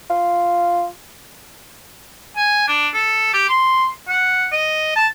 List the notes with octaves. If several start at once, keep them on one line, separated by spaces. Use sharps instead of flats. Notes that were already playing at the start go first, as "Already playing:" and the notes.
F4
G#5
D4
A4
G4
C6
F#5
D#5
A5